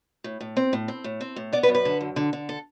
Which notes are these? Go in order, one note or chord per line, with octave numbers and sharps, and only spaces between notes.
A2
A2
C4
A2
C4
A2
C4
A2
B3 D5
B4
F#2
B4
D3
F#2
D3
D3
A4